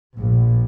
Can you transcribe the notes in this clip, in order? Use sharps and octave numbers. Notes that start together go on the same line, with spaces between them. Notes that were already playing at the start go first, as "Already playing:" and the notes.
A#1